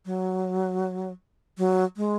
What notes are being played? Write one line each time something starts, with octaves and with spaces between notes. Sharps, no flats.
F#3
F#3
G#3